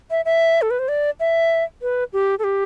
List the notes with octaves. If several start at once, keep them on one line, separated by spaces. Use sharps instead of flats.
E5
E5
A4
B4
C5
D5
E5
B4
G4
A4
G4